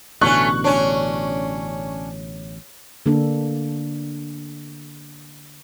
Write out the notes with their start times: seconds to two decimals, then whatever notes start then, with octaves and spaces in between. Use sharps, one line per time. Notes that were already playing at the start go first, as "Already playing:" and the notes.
0.21 A1 B2 D3 A3 C#4 C#6 F#6
0.64 C#4 D4 C#5
3.06 D3 A#3 D4 A4